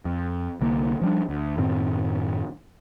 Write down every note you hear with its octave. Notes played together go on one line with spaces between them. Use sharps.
F2
C2 D3 A#3
F3 G3 D4
D2
F#2 A2 D#3 C4